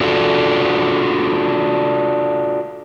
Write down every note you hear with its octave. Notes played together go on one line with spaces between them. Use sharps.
D4 F4 F#4 A4